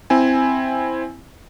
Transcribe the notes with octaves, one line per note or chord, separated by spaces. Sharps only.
C4 E4 G#5